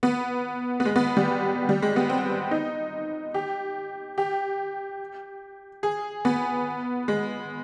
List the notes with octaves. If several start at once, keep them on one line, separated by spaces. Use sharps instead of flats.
B3
B3
G#3
B3
G3
G3
G#3
B3
C4
D#4
G4
G4
G#4
B3
G#3